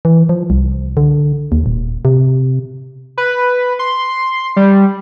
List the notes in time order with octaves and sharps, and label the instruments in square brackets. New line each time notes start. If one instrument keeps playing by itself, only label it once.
[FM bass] E3
F3
C2
D3
D#2
D#1
C3
[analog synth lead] B4
C6
G3